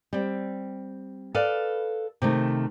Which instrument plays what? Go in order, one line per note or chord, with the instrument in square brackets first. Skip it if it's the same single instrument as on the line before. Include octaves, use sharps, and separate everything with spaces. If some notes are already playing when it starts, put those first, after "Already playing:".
[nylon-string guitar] G3 C4
A4 B4 D5 F5
C3 D#3 A3